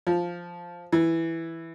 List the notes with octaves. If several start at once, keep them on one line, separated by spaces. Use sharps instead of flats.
F3
E3